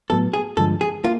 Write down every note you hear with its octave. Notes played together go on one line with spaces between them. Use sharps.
A2 F#3 B3 A4
G#4
G2 D3 F3 G#3 A4
G#4
A#3 F4